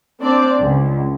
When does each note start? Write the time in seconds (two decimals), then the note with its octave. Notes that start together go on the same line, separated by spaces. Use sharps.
0.21 C4 D4 D5
0.59 C#2